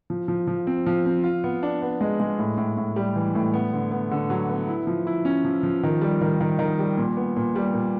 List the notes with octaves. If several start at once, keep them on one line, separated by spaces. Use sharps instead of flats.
F3
F3
F3
C4
F3
C4
F4
B3
D4
B3
G#3
G#3
A2
A2
A2
G3
E3
A2
B3
D3
B3
D3
F#3
B3
E4
F3
E4
C#4
F3
F3
D#3
G3
D#3
D#3
D#3
G3
A#2
B3
A#2
G3
A#2